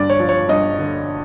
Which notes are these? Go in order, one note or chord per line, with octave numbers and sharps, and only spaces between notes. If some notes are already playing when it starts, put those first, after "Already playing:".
Already playing: G2 D3 D5
C#5
F3
C#5
G2 D#5
D3